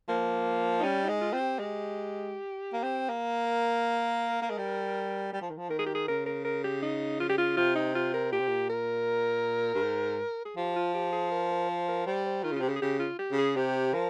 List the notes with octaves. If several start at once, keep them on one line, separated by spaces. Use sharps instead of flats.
F3 A#3
D#4
G3 C#4
D#4
G#3
F4
C4 F4
G4
G#3
A#3
C4
A#3
A#4
A#3
G#3
G3
G3
F3
D#3
F3
D#3 A#4
G#4
G4
G#4
C#3 A#4
A#4
A#4
G4
D#4
F4
G4
F4
C3 F4
D#4
F4
A#4
A#2 G4
C3
A#2
A#4
G2
G#2
G#4
F3 G4
F4
G4
G#4
A#4
A#4
C5
A#4
G3 C5
C5
D#3 F4
C#3
F4
C3 G4
C#3
G#4
C#3 G4
F4
G4
C#3
G#4
C3 G4
F3 A#4